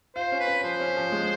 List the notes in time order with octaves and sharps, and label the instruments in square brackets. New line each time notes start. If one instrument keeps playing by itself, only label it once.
[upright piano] F4 [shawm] C5
[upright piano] C#4
[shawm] B4
[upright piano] C#4
[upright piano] F3 [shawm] C5
[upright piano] C#4
F3
G#3